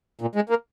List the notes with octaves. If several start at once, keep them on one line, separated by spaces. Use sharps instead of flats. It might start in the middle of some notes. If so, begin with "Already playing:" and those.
A#2
G#3
A#3